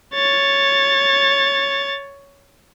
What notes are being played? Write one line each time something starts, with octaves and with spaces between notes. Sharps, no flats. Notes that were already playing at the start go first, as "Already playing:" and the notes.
C#5 A6